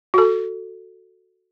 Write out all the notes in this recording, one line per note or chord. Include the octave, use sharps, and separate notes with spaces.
F#4 A4